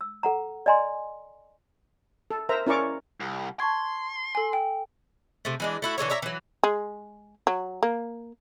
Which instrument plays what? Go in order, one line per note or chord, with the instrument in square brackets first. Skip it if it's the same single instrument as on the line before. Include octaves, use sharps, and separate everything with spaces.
[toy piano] E6
A4 F#5 A#5
D5 D#5 G#5 A#5 C6
[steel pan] A4
A#4 C5 E5 A#5
C#4 E4 A#4 D5 C#6 D6
[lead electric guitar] C2
[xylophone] A5 C#6 G#6 [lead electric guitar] C6
[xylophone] A4 G#5
G5
[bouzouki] C3 A3
E3 G#3 D4
A3 E4 F#4
D3 E3 A4 C#5
C#5 D5 E5 A#5
E3 F#3
[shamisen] G#3
F#3
A#3